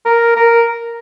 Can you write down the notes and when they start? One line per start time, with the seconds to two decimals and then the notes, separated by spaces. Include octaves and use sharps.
0.06 A#4
0.36 A#4